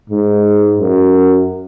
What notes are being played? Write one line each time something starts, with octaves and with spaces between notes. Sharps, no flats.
G#2
F#2